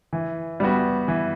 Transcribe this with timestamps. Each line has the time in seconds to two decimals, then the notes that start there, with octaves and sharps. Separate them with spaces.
0.13 E3
0.60 G3 B3 F#4
1.08 E3